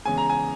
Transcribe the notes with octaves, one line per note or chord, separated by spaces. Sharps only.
E2 C#3 G#3 G#5
A#5
G#5